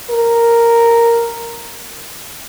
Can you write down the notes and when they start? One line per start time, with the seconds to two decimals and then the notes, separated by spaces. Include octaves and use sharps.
0.10 A#4